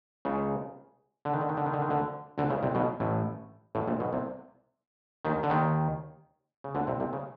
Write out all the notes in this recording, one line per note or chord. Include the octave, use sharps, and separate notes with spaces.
C#2 C#3
D3
D#3
D3
D#3
D3
D#3
D3
D#3
D2 D3
D2 D3
C#2 C#3
C2 C3
B1 B2
A1 A2
A1 A2
A#1 A#2
B1 B2
C2 C3
D#2 D#3
D3
D#2 D#3
C#3
D2 D3
C2 C3
C2 C3
C#3